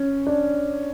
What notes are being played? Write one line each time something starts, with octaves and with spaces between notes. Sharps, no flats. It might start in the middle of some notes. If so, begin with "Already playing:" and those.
Already playing: C#4
D4